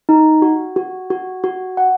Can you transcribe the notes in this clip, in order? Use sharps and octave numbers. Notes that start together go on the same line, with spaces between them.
D#4
F#4
F#4
F#4
F#4
F#5